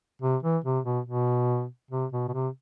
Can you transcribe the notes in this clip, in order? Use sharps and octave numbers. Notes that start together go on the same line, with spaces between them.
C3
E3
C3
B2
B2
C3
B2
B2
C3